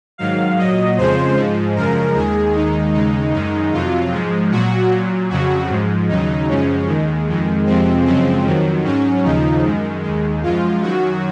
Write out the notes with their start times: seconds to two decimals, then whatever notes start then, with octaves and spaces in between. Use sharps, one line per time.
0.18 G#2 D#3 F#3 F5
0.58 A#2 F#3 D#5
0.98 F2 C#3 F3 G#3 C5
1.36 G#2 F3 G#3
1.76 F#2 C#3 F3 G#3 A#4
2.15 D#2 D#3 G#3 G#4
2.54 D#2 D#3 G#3 D#4
2.94 D#2 C#3 G#3 D#4
3.33 F#2 D#3 G#3 D#4
3.72 F2 C3 F#3 F4
4.12 G#2 F3 G#3
4.51 A#2 F#3 F#4
4.91 A#2 F#3
5.30 F2 C#3 F#3 F#4
5.69 G#2 F3 G#3
6.09 D#2 C#3 F#3 D#4
6.49 F#2 C#3 F3 G#3 C#4
6.87 D#2 D#3 G#3
7.27 F2 D#3 G#3
7.66 F2 C3 F3 G#3 C4
8.06 F#2 C#3 F3 G#3 C4
8.45 F2 D#3 F#3
8.84 G#2 F#3 C#4
9.24 D#2 C#3 F3 D#4
9.64 F#2 D#3 G#3
10.03 D#2 D#3 G#3
10.43 F#2 F3 G#3 F4
10.81 F#2 D#3 F#3 F#4